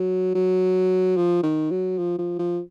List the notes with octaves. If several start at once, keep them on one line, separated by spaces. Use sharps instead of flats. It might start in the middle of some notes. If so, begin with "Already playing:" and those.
Already playing: F#3
F#3
F3
D#3
F#3
F3
F3
F3